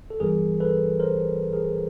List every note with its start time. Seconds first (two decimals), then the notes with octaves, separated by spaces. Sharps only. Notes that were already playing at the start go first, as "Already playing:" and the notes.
0.10 A4
0.20 G2 E3 G3 B3 G#4 A#4
0.60 A4 B4
1.00 A#4 C5
1.53 G#4 A#4